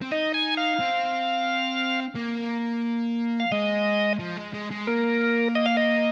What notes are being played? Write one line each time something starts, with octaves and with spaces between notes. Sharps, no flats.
C4
D#4 D#5
G#5
F5
C4
A#3
F5
G#3 D#5
F3
G#3
G#3
G#3
A#3 A#4
D#5
F5
D#5